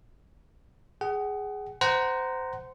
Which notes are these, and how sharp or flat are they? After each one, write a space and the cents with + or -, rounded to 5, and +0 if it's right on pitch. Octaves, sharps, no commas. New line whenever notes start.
G#4 +0 F#5 +30
C5 -20 F#5 +20 A#5 +0